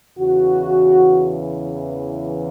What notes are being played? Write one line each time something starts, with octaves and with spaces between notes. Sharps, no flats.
E2 C#3 E3 F#4